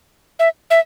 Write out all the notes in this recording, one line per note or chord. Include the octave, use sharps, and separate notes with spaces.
E5
E5